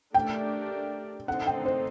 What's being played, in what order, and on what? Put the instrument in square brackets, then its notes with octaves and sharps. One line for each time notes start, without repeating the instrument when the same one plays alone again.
[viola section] A3 D4 G4 A#4 D5 [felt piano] G5
[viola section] D3 A3 C4 D#4 A4 [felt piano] F#5
[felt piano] G5
C5